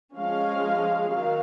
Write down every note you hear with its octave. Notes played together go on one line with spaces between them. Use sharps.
F3 G#3 C#4 F5
D#3 F#3 F5